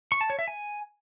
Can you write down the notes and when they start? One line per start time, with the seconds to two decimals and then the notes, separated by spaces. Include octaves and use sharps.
0.12 C#6
0.21 A5
0.30 C#5
0.39 E5
0.48 G#5